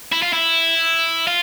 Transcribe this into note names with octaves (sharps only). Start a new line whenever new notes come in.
E4
F4
E4
F4